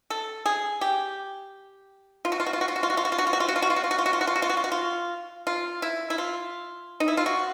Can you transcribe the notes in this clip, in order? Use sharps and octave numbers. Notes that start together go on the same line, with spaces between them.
A4
G#4
G4
F4
F#4
F4
F#4
F4
F#4
F4
F#4
F4
F#4
F4
F#4
F4
F#4
F4
F#4
F4
F#4
F4
F#4
F4
F#4
F4
F#4
F4
F#4
F4
F#4
F4
F#4
F4
F#4
F4
F#4
F4
F4
E4
E4
F4
D#4
E4
F4
F#4